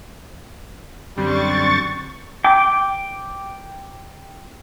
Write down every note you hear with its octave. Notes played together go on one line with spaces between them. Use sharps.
F#2 D3 G3 C4 C#6 A6
G5 D6